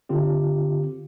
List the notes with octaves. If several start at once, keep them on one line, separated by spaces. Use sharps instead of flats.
D3 C4 F4 G4